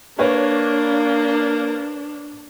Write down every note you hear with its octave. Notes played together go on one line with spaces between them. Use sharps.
A#3 D4 B4 C#5